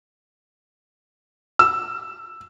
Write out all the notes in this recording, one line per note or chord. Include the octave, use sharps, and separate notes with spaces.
E6